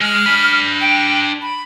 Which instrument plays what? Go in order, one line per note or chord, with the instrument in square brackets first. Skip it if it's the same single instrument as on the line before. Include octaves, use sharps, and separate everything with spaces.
[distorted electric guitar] G#3 [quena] F6
[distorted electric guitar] D4 B5
[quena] G5
B5